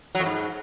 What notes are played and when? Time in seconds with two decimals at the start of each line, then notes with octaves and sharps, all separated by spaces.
0.15 F#3
0.20 F2
0.26 G#2